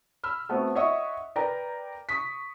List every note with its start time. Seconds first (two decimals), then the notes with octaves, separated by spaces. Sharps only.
0.24 B5 E6 F6
0.49 A3 B3 C4 F#4
0.75 C#5 D#5 E5 F#5 C#6 D#6
1.36 A#4 B4 D5 G5 A#5
2.09 C#6 D#6 B6